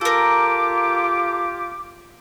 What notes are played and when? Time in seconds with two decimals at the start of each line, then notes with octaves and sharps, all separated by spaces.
0.01 F4 G4 A4 A#4 D6